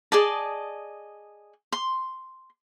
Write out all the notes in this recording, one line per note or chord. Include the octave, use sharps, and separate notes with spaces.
G#4 D5 D#5 A5
C6